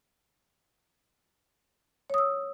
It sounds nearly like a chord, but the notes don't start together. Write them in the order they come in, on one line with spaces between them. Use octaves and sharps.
C#5 D#6 E6